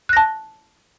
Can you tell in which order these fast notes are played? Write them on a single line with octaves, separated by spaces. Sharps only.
F#6 A#6 A5